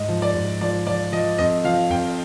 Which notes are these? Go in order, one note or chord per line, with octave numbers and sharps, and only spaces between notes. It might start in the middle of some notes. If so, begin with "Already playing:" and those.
Already playing: G#2 D#5
F3
D5
G#2
F3 D5
F3 D5
F3 D#5
F2 D#5
F3 F5
F2 G5